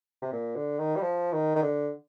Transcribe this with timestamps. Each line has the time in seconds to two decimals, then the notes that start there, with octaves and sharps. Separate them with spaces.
0.22 C3
0.33 A#2
0.56 D3
0.79 D#3
0.96 G3
1.02 F3
1.32 D#3
1.56 D#3
1.63 D3